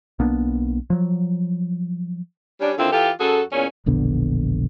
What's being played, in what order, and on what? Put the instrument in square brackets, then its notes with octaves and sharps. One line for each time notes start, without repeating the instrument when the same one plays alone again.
[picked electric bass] B1 A#3 B3 D4
F3 F#3
[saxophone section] G3 C#4 D4
D3 D#3 C4 E4 F4
E3 F4 G4 A4
F#2 F#4 G#4 A4
E2 A#2 C#4
[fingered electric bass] E1 A#1 D3 B3